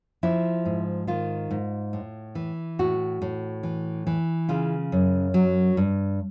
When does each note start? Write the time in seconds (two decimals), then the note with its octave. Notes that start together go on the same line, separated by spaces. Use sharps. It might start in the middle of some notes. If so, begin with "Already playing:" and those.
0.23 F3 E4
0.65 G#2
1.07 D#3 F4
1.51 G#2
1.93 A2
2.35 E3
2.79 A2 F#4
3.22 A2
3.63 E3
4.07 E3
4.49 C#3 F4
4.92 F#2
5.34 F#3
5.77 G2